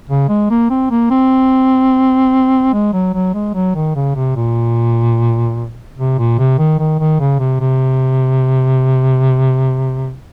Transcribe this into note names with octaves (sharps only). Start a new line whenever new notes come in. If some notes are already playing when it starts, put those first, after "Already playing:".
C#3
G#3
A#3
C4
A#3
C4
G#3
F#3
F#3
G#3
F#3
D#3
C#3
C3
A#2
C3
A#2
C3
D#3
D#3
D#3
C#3
C3
C3